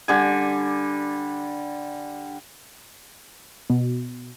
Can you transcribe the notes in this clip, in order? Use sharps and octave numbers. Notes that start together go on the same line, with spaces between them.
D3 G3 G#5
B2